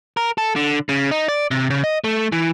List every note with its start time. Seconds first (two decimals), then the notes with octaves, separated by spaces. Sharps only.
0.17 A#4
0.38 A4
0.56 D3
0.89 C#3
1.11 D#4
1.29 D5
1.51 C3
1.70 C#3
1.84 D#5
2.04 A3
2.32 E3